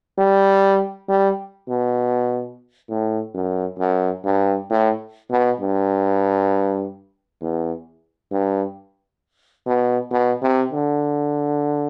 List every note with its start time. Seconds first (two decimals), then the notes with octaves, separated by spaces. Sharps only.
0.18 G3
1.09 G3
1.68 B2
2.89 A2
3.34 F#2
3.79 F#2
4.24 G2
4.70 A2
5.30 B2
5.60 G2
7.41 E2
8.32 G2
9.67 B2
10.11 B2
10.42 C3
10.72 D3